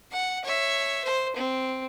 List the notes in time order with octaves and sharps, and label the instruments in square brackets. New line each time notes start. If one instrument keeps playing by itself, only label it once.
[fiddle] F#5
C#5 E5
C5
C4